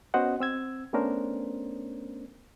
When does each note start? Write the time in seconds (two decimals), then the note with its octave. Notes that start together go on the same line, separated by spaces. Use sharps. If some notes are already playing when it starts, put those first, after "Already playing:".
0.14 B3 C#4 F#4 C5 D#5 F#5
0.40 C4 E6 G#6
0.93 A3 B3 C#4 D4 A#4 C5